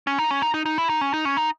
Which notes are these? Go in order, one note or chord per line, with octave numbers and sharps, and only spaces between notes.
C#4
D#4
C#4
D#4
D#4
D#4
E4
D#4
C#4
D#4
C#4
D#4